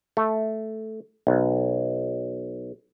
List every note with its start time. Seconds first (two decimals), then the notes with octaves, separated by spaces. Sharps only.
0.17 A3
1.27 B1